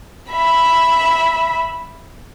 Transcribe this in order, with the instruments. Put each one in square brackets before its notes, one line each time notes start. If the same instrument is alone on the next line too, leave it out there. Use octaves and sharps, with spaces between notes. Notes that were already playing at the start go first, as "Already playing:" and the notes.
[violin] E5 B5